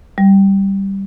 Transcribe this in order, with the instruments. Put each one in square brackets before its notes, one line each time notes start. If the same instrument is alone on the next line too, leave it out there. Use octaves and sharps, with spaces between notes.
[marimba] G3